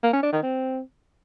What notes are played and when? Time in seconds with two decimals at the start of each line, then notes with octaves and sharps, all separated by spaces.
0.03 A#3
0.13 C#4
0.23 D4
0.33 D#3
0.43 C4